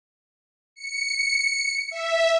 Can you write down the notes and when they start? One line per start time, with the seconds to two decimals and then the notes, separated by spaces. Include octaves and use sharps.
0.75 C#7
1.90 E5